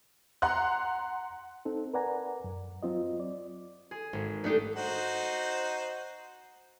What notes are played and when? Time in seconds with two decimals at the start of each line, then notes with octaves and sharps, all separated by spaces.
0.42 F#5 A#5 C6 F#6
1.65 C4 D#4 A4
1.94 A#4 B4 D5 F#5 G#5 A#5
2.44 F#2
2.83 F#3 C4 F4 D#5
3.20 D5
3.91 G#4
4.13 G#1
4.44 A3 D4 D#4 G4
4.76 D#4 F#4 C5